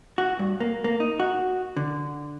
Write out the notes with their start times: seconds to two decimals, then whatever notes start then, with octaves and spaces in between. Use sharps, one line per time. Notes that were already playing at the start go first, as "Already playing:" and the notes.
0.18 F#4
0.39 G2
0.60 A#3
0.84 A#3
1.00 D#4
1.20 F#4
1.77 D3